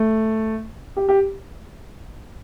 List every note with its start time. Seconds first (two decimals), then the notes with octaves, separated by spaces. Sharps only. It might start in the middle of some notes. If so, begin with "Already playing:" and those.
Already playing: A3
0.97 G4
1.09 G4